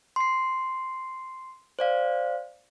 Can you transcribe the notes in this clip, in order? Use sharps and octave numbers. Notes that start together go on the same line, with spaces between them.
C6 C7
C5 D5 F5